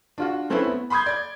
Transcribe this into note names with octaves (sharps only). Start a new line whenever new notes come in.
D4 F4 F#4
A3 C4 C#4 E4 A4 B4
B3
B5 C6 D#6 G6 G#6
D5 G#6